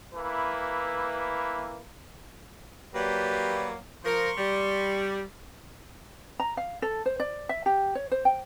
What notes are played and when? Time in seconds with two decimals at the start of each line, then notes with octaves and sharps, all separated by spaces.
0.14 E3 A#3 E4 B4
2.94 F#3 A#3 G4 B4 D5
4.04 F3 A#4 C6 C#6
4.37 G3
6.40 A#5
6.57 F5
6.82 A4
7.06 C5
7.20 D5
7.49 E5
7.66 G4
7.95 C#5
8.12 C5
8.25 G5